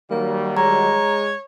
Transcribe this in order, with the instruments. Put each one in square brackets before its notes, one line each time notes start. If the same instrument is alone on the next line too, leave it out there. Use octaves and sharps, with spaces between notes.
[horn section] D#3 F#3 G3 [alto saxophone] A#3
[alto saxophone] G#3 [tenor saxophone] C#5 [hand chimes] A#5